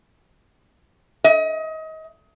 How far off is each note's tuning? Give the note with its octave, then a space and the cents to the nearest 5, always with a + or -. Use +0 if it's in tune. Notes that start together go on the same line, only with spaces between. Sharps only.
D#5 +30